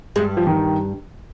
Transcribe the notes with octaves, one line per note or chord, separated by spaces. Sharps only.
G2 G3 G#3
F3
D#3